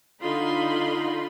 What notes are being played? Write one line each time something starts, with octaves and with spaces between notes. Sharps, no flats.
D3 D#4 F4 B5 C6